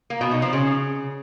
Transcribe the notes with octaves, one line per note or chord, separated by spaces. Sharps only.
A#3
B2
D#4
F3
C#3